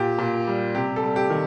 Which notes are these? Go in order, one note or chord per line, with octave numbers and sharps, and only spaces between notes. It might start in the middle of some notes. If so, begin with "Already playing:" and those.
Already playing: A#2 G4
A#2
G3
C3 G4
A4
G3
G4
D#3